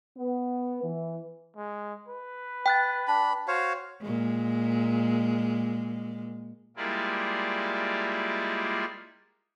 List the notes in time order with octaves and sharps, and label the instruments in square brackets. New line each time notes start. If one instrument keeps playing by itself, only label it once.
[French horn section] B3
E3
[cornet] G#3
B4
[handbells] G5 F#6 A6
[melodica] D4 B5
[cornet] F#4 [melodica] C5 C#5 F5
[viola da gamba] A#2 G#3
[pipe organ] G3 G#3 A#3 E4 F4 D5